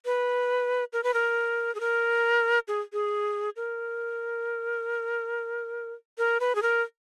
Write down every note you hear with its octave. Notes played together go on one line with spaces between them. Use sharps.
B4
A#4
B4
A#4
G#4
A#4
G#4
G#4
A#4
A#4
B4
G#4
A#4